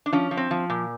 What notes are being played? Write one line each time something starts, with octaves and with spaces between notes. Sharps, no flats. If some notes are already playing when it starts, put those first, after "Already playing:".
D4
F3 C#4
F3
C4
F3
A#2